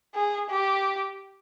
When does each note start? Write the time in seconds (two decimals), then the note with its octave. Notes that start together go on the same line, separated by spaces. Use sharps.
0.15 G#4
0.50 G4